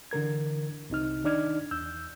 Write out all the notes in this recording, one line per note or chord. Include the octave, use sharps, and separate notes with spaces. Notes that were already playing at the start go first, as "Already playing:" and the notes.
D3 E3 A#4 G#6
C2 C3 D#4 F6
D#3 D4 D#4 D5 F6 G#6
E2 E6 G6